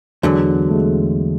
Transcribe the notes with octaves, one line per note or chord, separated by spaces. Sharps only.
E2 D3 F#3 G#3
A3
G#3